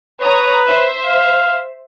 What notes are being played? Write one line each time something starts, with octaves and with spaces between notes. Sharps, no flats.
B4 C#5 A#5 D#6
C5 E5
F5